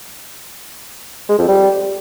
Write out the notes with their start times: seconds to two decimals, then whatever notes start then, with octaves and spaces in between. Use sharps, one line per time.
1.29 G#3
1.38 F2
1.48 G3